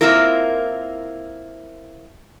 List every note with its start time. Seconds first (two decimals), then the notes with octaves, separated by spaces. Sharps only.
0.01 A#3 C4 E4 F4 A#4